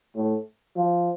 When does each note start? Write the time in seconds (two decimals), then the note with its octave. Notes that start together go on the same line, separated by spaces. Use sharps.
0.16 A2
0.76 F3